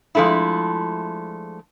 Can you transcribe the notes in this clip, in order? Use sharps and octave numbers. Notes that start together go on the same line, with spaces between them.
F3 G#3 A3 D4 E4